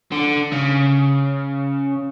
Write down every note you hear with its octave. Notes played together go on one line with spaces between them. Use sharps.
D3
C#3